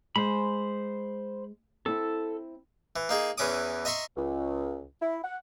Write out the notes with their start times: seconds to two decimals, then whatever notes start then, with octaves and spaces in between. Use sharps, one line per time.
0.16 G#3 C5 B5
1.86 C4 E4 A4
2.96 E3
3.09 A#3 D#4 G#4
3.38 E2 E3 C#4 D6 D#6
3.85 D#5 E5 A#5 C6 C#6
4.16 C#2
5.01 E4
5.24 F#5